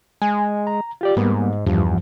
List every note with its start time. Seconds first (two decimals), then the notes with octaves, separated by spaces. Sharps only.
0.22 G#3 G#5
0.67 A#5
1.01 F4 G4 D5
1.17 G#2 G3 A#3 B3
1.66 E2 G2 F3